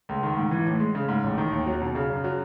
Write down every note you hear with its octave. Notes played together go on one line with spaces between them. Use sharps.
C#2
D#3
G#2
E3
A2
G#3
C#3
G#2
A1
D#3
D#2
F#3
B2
C#3
F#2
F#3